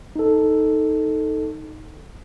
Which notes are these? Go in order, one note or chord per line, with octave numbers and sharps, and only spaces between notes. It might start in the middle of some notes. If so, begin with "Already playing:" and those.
D#4 A4